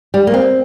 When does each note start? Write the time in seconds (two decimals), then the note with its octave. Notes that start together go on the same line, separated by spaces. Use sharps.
0.14 G3
0.27 A#3
0.34 C4